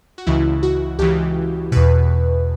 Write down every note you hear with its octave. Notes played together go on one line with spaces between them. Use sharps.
F#4
C#2 C#3 E3 E4
F#4
C#2 C#3 E3 G4
E2 B2 B4